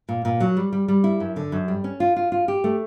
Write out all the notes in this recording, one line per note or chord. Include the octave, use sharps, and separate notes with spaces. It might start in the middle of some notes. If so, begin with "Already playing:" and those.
A#2
A#2
F#3
G3
G3
G3
E4
F#2
D3
F#2
G3
C#4
F4
F4
F4
G4
A3